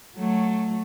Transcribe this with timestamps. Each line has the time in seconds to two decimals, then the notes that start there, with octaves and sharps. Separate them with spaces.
0.17 F#3 A3